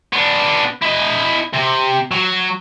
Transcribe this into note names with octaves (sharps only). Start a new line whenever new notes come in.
B3 D4
E4 D#5
C3
F#3